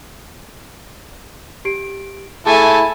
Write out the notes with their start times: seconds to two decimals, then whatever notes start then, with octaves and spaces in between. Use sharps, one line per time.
1.65 G4 D7
2.46 A3 E4 G#4 A4 E5 G#5 A5